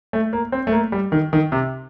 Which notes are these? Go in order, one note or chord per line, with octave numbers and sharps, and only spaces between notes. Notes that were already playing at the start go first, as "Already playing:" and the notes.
A3
A#3
C4
A3
A#3
G3
D#3
D#3
C3